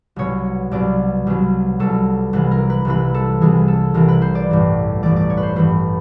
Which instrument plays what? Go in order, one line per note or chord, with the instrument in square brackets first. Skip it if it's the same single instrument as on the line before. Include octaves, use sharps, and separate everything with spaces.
[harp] C2 B2 F#3 C#5
C2 B2 F#3 D5
C2 B2 F#3
C2 B2 F#3 A4
C2 C3 E3 B4
A#4
B4
C2 C3 E3 B4
A4
C2 C3 E3 G#4
A4
C2 C3 E3 A#4
B4
C5
D5
A1 G2 E3
A1 G2 E3 D5
D5
C#5
B4
C5
A1 G2 E3 B4